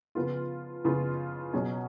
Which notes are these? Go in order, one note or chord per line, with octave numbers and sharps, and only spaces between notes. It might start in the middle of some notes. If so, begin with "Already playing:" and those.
C#3 F3 B3 F4
C#3 F3 B3 F4
B2 F#3 C#4 G#4